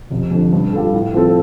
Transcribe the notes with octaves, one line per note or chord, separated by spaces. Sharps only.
F1
F2 D3
G2
G3 F4 A4
A2
F3 C4 A4